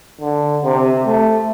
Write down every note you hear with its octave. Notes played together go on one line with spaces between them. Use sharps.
D3
C3
A3